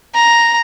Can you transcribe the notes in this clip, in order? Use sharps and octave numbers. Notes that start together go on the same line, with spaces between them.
A#5